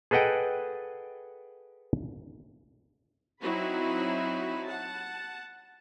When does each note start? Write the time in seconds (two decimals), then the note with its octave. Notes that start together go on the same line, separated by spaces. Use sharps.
0.11 G#4 A4 B4 D#5 F#5 G5
3.41 F#3 C4 D#4 E4 F#4 B5
4.64 F#5 A5